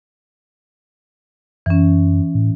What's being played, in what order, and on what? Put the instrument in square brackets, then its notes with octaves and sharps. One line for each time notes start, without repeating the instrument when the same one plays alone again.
[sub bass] F#2 [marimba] E3 C#4
[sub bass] A2